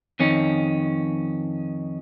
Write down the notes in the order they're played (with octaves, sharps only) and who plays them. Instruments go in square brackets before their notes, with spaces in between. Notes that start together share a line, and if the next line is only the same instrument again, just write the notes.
[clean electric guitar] F2 D#3 C#4